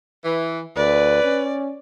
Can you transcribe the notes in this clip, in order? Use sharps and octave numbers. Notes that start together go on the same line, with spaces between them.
E3
D2 B4 D5
C#4